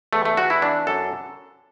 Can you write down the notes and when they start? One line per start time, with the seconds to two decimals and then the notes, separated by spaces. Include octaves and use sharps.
0.13 E2 A3
0.25 A3
0.37 E2 F#4
0.50 E4
0.62 E3 D4
0.87 F#2 A4